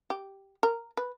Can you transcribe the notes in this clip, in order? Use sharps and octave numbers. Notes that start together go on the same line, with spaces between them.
G4
A#4
B4